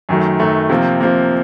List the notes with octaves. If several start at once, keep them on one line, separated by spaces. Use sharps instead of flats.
F#2 D#3 F#3 A3
F#2 D#3 F#3 A3
C3 F3 A#3
C3 F3 A#3